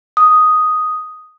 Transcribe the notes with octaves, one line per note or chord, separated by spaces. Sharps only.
D#6